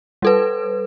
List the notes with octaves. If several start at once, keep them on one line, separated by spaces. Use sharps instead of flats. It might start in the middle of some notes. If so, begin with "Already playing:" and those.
G3 A4 B4